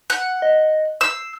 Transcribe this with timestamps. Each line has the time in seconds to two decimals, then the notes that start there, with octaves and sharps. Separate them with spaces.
0.10 F#5 F#6
0.42 D#5
1.01 E6 C7